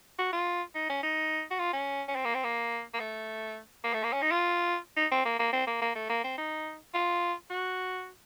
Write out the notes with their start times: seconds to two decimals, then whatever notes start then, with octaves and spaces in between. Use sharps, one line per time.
0.19 F#4
0.33 F4
0.75 D#4
0.89 C#4
1.03 D#4
1.51 F#4
1.59 F4
1.73 C#4
2.08 C#4
2.16 C4
2.25 A#3
2.34 C4
2.44 A#3
2.94 A#3
3.00 A3
3.84 A#3
3.94 A3
4.03 A#3
4.13 C#4
4.22 D#4
4.31 F4
4.97 D#4
5.11 C4
5.25 A#3
5.39 A#3
5.53 C4
5.67 A#3
5.82 A#3
5.95 A3
6.09 A#3
6.24 C4
6.38 D#4
6.94 F4
7.50 F#4